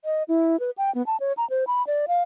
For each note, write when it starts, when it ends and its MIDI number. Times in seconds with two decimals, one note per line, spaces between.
0.05 0.23 75
0.28 0.59 64
0.60 0.71 71
0.78 0.93 79
0.95 1.05 59
1.07 1.17 81
1.20 1.33 73
1.37 1.48 82
1.50 1.64 72
1.67 1.85 83
1.87 2.06 74
2.08 2.23 77